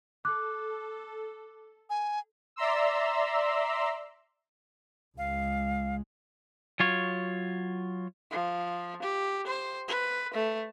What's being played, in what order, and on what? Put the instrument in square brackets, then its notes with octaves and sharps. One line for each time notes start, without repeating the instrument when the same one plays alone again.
[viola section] A4 [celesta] D6 F#6
[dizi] G#5
[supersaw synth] D5 E5 A#5 C6 E6
[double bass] C#2 G#3 [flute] F5
[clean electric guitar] F#3 F4 C#5
[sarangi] F3
G4
C5
B4
A3